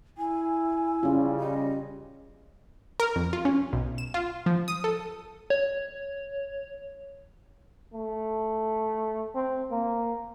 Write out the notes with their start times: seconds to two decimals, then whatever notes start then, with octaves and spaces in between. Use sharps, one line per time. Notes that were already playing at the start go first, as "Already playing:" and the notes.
0.17 E4 G#5
1.03 C#3 G3 C#4 F4
1.39 D#5
3.00 A#4
3.16 F2
3.33 F4
3.45 C#4
3.73 B1
3.98 E7
4.14 F4
4.46 F3
4.68 D#6
4.84 A4
5.50 C#5
7.94 A3
9.35 C4
9.71 A#3